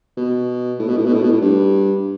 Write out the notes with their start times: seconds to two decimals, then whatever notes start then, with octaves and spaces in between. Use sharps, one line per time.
0.17 B2
0.79 A2
0.88 B2
0.97 A2
1.06 B2
1.14 A2
1.22 B2
1.31 A2
1.41 G2